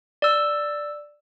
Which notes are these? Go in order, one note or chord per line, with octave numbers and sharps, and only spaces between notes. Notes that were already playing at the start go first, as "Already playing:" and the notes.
D5 E6